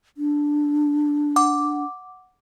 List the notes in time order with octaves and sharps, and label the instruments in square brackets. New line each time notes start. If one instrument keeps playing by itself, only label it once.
[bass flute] D4
[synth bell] F#5 D6